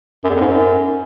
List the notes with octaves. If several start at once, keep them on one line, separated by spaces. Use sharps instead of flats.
F#2
E2
F2
G#2
F#2